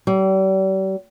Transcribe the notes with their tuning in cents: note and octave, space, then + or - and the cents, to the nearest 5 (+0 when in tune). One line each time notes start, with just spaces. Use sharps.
G3 -40